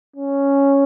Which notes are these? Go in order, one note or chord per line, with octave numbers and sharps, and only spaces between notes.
C#4